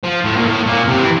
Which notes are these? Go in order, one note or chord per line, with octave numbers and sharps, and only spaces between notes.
F3
A2
A#2
A2
A#2
C3
E3